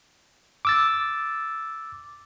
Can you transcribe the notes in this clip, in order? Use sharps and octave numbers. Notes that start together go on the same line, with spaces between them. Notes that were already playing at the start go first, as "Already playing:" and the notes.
D6 E6 A6